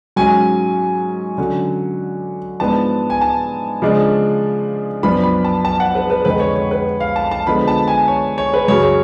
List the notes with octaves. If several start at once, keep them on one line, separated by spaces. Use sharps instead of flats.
G#2 F#3 C#4 G#5
D3 F#3 C#4
G#2 F3 B3 D4 A5
G#5
A5
C#3 F3 G#3 D4
F#2 F3 B3 D4 B5
B5
A5
A5
F#5
B4
B4
F2 D3 G#3 B4
C#5
C#5
B4
F5
A5
A5
D3 F3 G#3 B3 B5
A5
G#5
C#5
C#5
B4
F#2 C#3 F#3 C#5
C#5